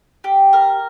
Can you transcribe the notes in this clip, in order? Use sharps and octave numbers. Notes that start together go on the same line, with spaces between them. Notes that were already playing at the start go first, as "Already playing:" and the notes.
G4
A#4